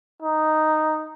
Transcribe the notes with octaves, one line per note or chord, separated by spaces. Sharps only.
D#4